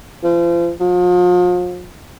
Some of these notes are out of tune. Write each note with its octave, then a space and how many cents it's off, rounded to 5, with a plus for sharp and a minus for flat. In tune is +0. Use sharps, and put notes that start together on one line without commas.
F3 -35
F3 +40